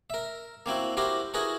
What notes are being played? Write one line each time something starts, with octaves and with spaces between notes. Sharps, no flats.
A#4 E5
A#3 C4 E4 F#4
E4 F#4 G4 A#4 C5
E4 F#4 G#4 A#4 B4